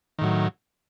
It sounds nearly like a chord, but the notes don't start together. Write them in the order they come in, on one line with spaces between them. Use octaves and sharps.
D#3 A2 F#3